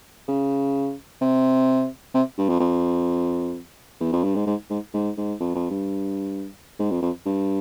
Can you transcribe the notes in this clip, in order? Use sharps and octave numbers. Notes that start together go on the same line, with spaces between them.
C#3
C3
C3
G2
F2
F2
E2
F2
G2
G#2
G#2
G#2
G#2
G#2
F2
F2
G2
G#2
F2
F2
G2